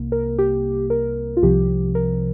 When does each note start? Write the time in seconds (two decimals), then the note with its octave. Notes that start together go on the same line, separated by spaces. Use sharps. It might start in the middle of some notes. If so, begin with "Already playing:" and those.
Already playing: C2 C3 A#3
0.12 A#4
0.39 G4
0.90 A#4
1.37 F4
1.43 C2 C3 F3 G4
1.95 A#4